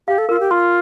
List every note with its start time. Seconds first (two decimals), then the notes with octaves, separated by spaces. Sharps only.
0.08 G4 F5
0.18 A4
0.29 F4 A#4
0.40 G4
0.51 F4 C6